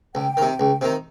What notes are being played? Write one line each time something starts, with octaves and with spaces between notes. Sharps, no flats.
C#2 G5
C3 D#3
C#2
C3 D#3